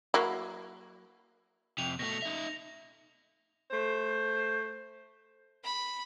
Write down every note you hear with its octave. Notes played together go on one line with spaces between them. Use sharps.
F#3 A#3 E4
F2 C3 F7
B2 A3 A#6
D#4 E5
A3 C5
B5